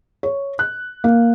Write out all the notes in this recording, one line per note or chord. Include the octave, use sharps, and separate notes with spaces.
C#5
F#6
A#3